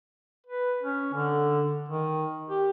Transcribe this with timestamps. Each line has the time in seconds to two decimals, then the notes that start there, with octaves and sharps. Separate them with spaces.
0.47 B4
0.83 C#4
1.14 D3
1.89 D#3
2.50 G4